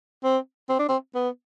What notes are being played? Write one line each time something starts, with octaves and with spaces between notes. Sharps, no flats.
C4
C4
D4
C4
B3